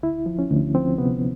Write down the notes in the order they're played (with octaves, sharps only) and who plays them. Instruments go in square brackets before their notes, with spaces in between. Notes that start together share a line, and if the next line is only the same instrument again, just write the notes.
[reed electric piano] D2 E4
F3
C#4
D2
F3 C4
C3 B3